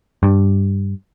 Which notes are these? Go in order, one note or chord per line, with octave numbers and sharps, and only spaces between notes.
G2